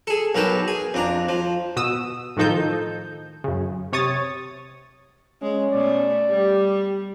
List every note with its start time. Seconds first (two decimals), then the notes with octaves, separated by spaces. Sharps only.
0.07 G#4 A4
0.35 B1 A#4 B4 G5 A5
0.68 G#4
0.94 F2 D4 A#5
1.29 F3
1.76 B2 D#6 E6
2.37 A2 D#3 F3 D#4 A4 G6
3.44 F#2 C#3
3.93 C3 C#5 D#6 A6
5.42 G#3 C#4
5.72 B2 A3 D5
6.29 G3 G4